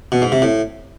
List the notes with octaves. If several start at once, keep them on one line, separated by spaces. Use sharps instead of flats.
B2
G#2
C3
A2